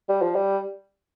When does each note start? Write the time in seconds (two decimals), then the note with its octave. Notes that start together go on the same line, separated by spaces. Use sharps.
0.09 G3
0.22 F3
0.36 G3